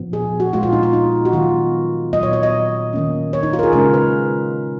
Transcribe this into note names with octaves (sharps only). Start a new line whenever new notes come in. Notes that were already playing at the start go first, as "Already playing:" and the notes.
Already playing: A#2 F3 B3
G#4
F#4
A#2 G#3 B3 F4
F4
D#4
F4
D#4
F#4
D#3 F#3 B3 F4
A#2 F#3 B3 D#5
C#5
C#5
D#5
D#3 A#3 C#4
C#5
D#4
F4
A#4
G#4
C#3 G#3 C#4 A#4
B4